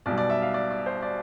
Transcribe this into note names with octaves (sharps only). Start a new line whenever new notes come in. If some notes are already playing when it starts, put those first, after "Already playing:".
B1 B2 G3 D5
D5
E5
F5
D5
D5
C5
D5